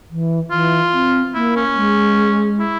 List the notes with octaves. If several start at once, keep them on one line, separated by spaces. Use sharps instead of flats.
E3
E3 F4
C4
A#3 E4
C#4
G#3
E4